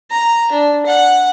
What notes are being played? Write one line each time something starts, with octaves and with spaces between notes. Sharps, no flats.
A#5
D4
F#5